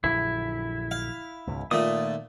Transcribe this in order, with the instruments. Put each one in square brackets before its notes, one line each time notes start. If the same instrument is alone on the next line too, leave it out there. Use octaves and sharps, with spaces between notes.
[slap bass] A#1 F#2 D3 [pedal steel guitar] E4
[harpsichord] F5
[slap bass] C#2 G#2 B2
[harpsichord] A#2 A3 [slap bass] D#3 [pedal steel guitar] D#6